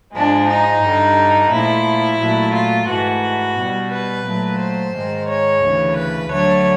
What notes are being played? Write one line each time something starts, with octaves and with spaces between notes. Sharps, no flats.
G#2 F3 G#3 D4
D#4
G2 D3 G3
A#2 F3 A3 E4
A#2 F#3 A3
F4
G#2 E3 A3 F#4
B2 G3
B4
A#2 F#3 A3
C5
G#2 D#3 G#3
C#5
D2 C#3 E3
B4
D2 D3 F#3 A3 C#5